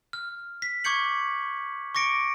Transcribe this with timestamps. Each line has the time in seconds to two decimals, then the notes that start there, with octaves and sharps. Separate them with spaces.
0.13 F6
0.62 B6
0.84 C#6 D6 G6 G#6 C#7 F#7
1.95 C#6 D6 A#6 C#7 D7